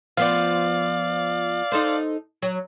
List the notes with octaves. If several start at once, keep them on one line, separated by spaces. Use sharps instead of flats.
F3 B3 D5 F5
D#4 A4 C5
F#3